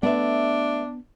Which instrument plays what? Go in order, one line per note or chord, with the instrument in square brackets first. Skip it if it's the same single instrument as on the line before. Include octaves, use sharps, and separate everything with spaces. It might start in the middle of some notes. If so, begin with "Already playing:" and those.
[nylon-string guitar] A3 B4 E5 [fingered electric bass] B3 [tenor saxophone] D4